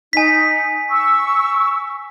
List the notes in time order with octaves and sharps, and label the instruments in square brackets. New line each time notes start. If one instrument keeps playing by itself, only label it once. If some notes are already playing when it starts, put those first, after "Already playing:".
[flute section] D#4 [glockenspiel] G#5 B6
[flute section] C#6 E6